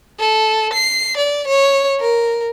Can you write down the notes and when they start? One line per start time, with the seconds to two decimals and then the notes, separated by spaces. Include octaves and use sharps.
0.19 A4
0.73 C7
1.17 D5
1.48 C#5
2.00 A#4